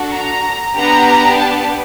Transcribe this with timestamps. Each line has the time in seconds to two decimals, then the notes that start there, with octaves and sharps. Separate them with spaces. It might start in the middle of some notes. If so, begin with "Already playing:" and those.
Already playing: D4 F#4 A4
0.12 A#5
0.74 B3 D4 G4 A#5
1.37 A5